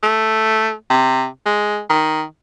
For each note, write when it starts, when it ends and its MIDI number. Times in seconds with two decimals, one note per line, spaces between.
0.03 0.73 57
0.90 1.26 48
1.46 1.80 56
1.89 2.23 51